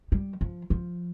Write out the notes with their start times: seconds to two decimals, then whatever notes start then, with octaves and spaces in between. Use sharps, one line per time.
0.12 G3
0.41 F3
0.70 F3